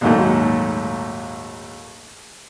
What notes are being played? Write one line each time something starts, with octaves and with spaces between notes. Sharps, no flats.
A#1 D#2 G#2 F#3 A3